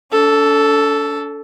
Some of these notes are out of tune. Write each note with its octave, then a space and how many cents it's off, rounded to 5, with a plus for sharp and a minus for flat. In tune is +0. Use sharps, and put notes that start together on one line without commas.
D4 -45 A4 +0